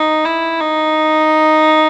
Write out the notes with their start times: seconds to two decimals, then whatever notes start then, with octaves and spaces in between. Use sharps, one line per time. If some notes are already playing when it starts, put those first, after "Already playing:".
Already playing: D#4
0.25 E4
0.60 D#4